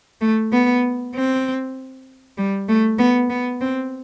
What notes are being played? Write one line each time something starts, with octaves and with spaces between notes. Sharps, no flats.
A3
B3
C4
G3
A3
B3
B3
C4